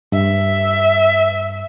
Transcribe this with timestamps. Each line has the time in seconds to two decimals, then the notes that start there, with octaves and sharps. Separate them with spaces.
0.12 G2 E5